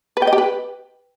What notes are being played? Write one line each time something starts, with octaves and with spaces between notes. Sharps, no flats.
B4
G5
D#5
G4
B4